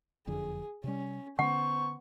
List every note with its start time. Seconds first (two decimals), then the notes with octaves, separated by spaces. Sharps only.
0.27 F#1 F2 D3 G#4
0.84 C3 G3 C#4
1.39 D3 B3 C#4 C5 F#5 C#6